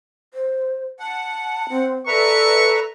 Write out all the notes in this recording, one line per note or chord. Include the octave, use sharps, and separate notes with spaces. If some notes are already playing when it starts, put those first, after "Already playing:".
C5
F#5 A5
C4
A4 B4 D5 E5 A#5 C#6